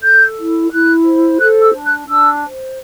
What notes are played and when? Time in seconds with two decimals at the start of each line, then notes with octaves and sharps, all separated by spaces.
0.01 A4 G6
0.36 E4
0.70 E4 F#6
1.04 C5
1.39 A4 F#6
1.62 E6
1.73 D4
1.85 F#6
2.07 D4 E6
2.43 C5